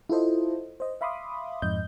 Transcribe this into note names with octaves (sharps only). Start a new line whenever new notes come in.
E4 F4 A4 C5 D#5
C5 D#5
E5 F5 B5 C6 D6 D#6
F2 G#2 D#5 G6